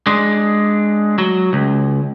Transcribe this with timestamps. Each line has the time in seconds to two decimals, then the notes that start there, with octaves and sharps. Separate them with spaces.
0.07 G#3 D4
1.18 F#3
1.53 C#2